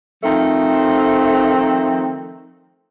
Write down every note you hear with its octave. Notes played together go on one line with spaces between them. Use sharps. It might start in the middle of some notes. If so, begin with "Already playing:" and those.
D#3 F3 A3 C4